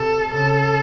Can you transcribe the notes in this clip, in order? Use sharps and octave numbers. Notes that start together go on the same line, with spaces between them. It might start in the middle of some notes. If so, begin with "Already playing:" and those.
Already playing: C3 A4
C#3 A4